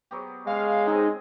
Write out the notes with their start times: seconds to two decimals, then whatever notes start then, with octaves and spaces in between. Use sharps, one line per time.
0.11 F#3 B3 G4
0.47 C#3 G#3 B3 F5
0.87 C4 D#4 G#4 A#4